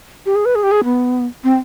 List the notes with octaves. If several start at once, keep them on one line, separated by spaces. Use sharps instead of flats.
G4
G#4
B4
G#4
G4
G#4
B3
C4